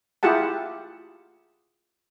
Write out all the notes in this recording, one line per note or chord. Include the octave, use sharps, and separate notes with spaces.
E4 F4 G4 G#4 F#5 A5